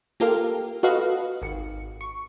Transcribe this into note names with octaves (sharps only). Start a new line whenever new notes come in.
A#3 F4 G4 A4 A#4 F5
F4 F#4 A4 B4 D#5 F5
G#1 C#7
C#6